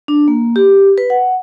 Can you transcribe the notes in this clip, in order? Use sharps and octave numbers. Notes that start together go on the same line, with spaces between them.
D4
A#3
G4
B4
F#5